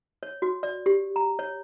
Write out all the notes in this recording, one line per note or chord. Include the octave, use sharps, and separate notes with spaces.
C#5
F#4
D5
G4
A#5
C#5